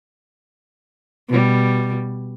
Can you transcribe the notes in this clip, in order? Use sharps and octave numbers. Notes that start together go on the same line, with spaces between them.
B2 G3